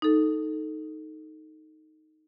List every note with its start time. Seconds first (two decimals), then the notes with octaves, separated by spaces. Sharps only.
0.02 D#4 A4